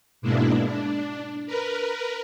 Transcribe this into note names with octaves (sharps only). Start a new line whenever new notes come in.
G#2 B2 G#3 A#3 D4 E4
D4
A#4 B4